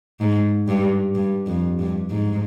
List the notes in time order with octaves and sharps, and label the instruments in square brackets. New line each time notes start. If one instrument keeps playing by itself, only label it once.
[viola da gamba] G#2
G2
G2
F2
G2
G#2